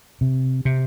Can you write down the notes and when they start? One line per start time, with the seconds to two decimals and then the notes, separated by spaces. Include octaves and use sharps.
0.21 C3
0.65 C3